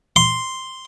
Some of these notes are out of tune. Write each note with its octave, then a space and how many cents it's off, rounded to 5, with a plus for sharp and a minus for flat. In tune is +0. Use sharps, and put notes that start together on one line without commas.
C6 +0